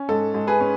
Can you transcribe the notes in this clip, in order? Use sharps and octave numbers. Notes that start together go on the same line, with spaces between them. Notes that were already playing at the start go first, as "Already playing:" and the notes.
Already playing: C#4
G#2 A4
G#2
G#4 B4
C#4